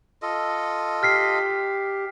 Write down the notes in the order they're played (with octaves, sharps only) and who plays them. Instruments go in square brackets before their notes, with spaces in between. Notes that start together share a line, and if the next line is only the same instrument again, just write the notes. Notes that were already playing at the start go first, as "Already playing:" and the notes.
[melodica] F4 A4 D#5
[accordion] G4 [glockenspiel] F6 B6 C7